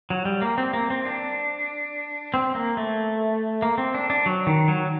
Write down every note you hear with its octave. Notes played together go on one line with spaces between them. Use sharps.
F#3
G3
A#3
C4
A#3
C4
D4
C4
A#3
A3
A#3
C4
D4
D4
F#3
D#3
F#3